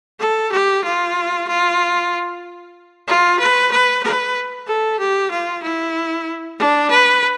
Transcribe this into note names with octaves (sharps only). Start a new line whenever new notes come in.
A4
G4
F4
F4
F4
B4
B4
B4
A4
G4
F4
E4
D4
B4